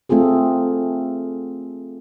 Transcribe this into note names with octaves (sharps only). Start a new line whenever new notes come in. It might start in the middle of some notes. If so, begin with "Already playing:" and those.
A3 C4 F4 G#4 A4